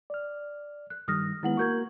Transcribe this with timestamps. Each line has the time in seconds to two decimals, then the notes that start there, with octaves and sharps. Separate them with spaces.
0.10 D5 F6
0.90 F#6
1.08 G2 D#3 G3 D#6 F6 A#6
1.43 D#3 G#3 B3 E4 F#5 F#7
1.57 A#3 F#4 A#4 C#6 G6 G#6